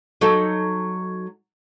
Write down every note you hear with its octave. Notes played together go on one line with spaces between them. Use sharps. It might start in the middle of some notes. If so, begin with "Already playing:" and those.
F#3 D#4 A4